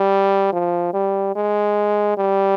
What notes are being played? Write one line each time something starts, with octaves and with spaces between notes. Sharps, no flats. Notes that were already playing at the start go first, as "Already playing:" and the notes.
Already playing: G3
F3
G3
G#3
G3